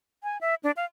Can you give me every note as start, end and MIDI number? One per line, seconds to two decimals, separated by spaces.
0.24 0.38 80
0.41 0.55 76
0.63 0.71 62
0.77 0.85 77